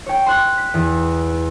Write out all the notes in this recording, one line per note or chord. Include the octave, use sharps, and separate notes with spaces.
C#5 G5
C6 F#6
B6
E2